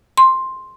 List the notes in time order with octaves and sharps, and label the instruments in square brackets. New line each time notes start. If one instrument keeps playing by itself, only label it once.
[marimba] C6